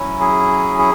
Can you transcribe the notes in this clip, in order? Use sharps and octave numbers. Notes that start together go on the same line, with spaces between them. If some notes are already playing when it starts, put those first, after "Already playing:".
Already playing: F#3 C#4 E4
G#4
G#4